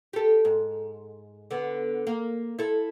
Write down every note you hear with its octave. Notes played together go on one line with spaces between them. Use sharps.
G4 A4
G#2
D3 B3
A#3
E4 A4